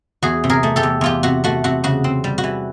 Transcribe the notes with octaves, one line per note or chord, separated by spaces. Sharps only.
E2 F#4 G#4
C3
G#4 A#4
A3
G4 A4
E2
E2 F4 G4
C3 F#4
A3 F#4
C3 F#4
C#3 F#4
C4
G3
F#4
E3